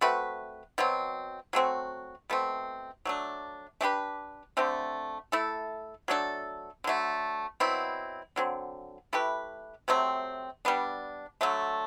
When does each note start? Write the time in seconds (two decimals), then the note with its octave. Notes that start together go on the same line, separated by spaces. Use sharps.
0.01 A3 C4 F#4 B4
0.78 B2 F#3 C4
1.53 F#3 A3 C4 F#4
2.30 B2 A3 C4
3.05 F#3 A3 D4
3.81 A3 D4 G4 B4
4.57 D3 A3 C4 G4
5.32 A3 E4 A4
6.08 F#3 A3 D4 A4
6.84 D3 F#3 A3
7.60 B2 F#3 C4 E4
8.36 D3 F#3 C4
9.13 A3 E4 G4 B4
9.88 C3 F#3 A3 C4
10.65 G3 B3 D4
11.41 D3 F#3 A3